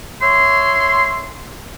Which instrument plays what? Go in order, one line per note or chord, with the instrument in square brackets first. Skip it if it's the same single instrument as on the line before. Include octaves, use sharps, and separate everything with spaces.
[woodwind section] C#5 E5 C6